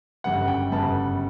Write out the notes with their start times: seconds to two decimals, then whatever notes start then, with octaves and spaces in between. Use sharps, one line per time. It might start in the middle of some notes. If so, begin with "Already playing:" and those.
0.24 G1 F#2 C#3 G3 B3 F#5
0.48 G5
0.71 G1 F#2 C#3 G3 B3 A5